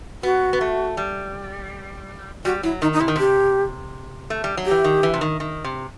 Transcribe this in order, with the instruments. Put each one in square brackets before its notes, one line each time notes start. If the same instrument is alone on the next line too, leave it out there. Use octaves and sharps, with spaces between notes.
[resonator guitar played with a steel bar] B3 [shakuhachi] F#4
[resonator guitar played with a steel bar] B3
A3
G3
[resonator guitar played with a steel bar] G3 [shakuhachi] F#4
[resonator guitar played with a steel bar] F#3 [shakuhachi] E4
[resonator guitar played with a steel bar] D#3 [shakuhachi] D#4
[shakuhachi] D#4
[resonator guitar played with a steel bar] C3 [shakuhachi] E4
[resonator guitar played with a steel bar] D#3
[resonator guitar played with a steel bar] C3 [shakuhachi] G4
[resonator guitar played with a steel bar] A3
G3
F#3
[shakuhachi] G4
[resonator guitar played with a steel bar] E3
D#3
E3
C3
D#3
D#3
C3